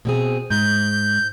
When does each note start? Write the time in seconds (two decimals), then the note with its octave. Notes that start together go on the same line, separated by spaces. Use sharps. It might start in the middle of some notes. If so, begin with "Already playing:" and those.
0.05 B2 C4 G#4
0.50 G#2 G6